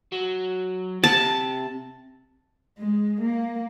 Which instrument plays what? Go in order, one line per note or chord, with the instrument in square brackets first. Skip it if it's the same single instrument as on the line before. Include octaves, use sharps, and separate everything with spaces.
[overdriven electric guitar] F#3
[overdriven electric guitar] C3 [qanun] A5
[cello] G#3
A#3